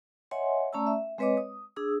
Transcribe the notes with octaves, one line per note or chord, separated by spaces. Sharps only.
C#5 D#5 E5 F#5 G#5 C6
A3 C#4 D5 A5 A#5 E6
E5
G#3 C4 B4 C#5 D#5 D6
D#6
D4 G#4 D#6 E6